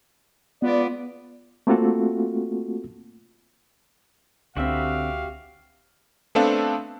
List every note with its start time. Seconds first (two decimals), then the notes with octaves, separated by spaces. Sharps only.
0.62 G#3 B3 F4 D5
1.67 A3 A#3 C4 F4 F#4 A4
4.57 C#2 D3 C4 F#4 G4 E5 F5
6.35 A3 B3 C4 D4 A4 F5